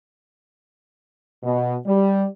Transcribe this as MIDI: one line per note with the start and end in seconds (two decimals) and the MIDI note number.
1.43 1.76 47
1.86 2.24 55